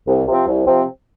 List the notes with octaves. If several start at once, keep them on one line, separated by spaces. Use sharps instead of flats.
C2
C3 F3 C4
C2
C3 F3 C4